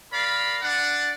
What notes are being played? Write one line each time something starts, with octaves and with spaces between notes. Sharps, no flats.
A#4 D5 F5 B5
D4 D5 F#5